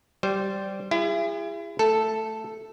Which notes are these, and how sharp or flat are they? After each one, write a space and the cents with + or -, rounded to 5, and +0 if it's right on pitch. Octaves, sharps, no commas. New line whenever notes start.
G3 -15 C5 +0
E4 +35 G#4 -40
A3 +0 A4 +0